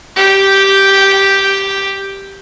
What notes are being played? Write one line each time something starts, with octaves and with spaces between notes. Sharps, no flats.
G4 G5